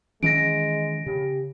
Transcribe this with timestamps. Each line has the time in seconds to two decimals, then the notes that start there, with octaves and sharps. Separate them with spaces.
0.23 D#3 E3 G#3 C#4 A#6 D7
1.06 C#3 G4